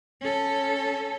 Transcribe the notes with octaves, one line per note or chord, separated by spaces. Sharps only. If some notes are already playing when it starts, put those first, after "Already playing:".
C#4 A4